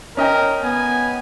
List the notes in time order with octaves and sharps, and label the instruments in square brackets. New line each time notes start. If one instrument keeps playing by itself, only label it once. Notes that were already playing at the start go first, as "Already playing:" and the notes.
[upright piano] C#4 D#5 G5 [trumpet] A#4
[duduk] B3 [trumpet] G#5